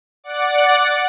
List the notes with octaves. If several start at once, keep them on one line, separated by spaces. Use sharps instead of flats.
D5 F#5